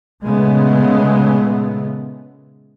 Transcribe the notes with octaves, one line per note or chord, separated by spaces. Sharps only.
A#2 C#3 G#3 A3 B3